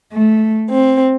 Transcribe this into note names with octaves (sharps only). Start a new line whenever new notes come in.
A3
C4